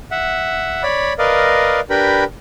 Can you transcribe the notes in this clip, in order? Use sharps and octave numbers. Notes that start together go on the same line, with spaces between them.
E5 F#5
C#5 D5 B5
A#4 B4 D5 D#5 F5
D4 G4 A#4 B4 G5 B5